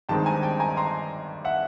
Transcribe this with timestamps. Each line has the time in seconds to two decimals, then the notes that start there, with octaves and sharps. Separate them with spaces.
0.09 G2 D#3 G#3 C4 G5 A5
0.26 G#5 A#5
0.43 G5 A5
0.60 G#5 A#5
0.77 A#5 C6
1.44 E5 F#5